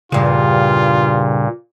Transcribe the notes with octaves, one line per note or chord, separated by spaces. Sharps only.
E2 G2 A#2 C#3 F4